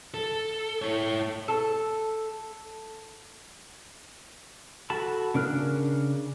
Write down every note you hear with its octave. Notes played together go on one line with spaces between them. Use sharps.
A4
E4 C#5
A4
F#4 A4 A5 B5
C#3 D4 A#4 F6 F#6